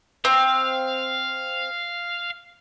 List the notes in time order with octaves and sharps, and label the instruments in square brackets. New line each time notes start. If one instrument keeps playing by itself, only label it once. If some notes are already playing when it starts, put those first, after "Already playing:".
[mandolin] C4 [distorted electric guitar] F5